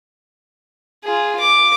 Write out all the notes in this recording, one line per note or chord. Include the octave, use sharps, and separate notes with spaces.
F4 G#4
D6